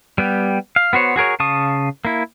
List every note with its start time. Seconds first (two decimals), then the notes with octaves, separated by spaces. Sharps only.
0.18 G3 B3 G4
0.76 F5
0.93 B3 F#4 C5 C#5
1.16 F#4 G#4 A#4 C#5
1.40 C#3 F5 A5 C#6 D#6
2.05 A#3 E4